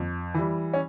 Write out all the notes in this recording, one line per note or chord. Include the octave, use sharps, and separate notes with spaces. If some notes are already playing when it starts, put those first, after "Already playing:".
Already playing: F2
E3 G3
C#4